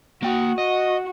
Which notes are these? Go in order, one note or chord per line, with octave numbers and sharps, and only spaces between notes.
A#3 F#4 G5
F#4 D#5